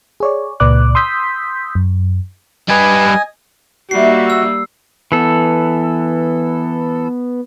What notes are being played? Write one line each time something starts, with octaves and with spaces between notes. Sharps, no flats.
G#4 C#5 D5
C#2 A#2 B4 D5 D6 F#6
C6 D#6 E6 G6 B6
F#2
G3 B4 D#5 G#5
G3 A#3 D#4 F#4 E5 C7
E6
E3 B3 A4